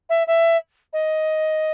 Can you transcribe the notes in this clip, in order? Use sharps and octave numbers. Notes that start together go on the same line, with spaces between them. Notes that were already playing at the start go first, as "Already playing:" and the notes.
E5
E5
D#5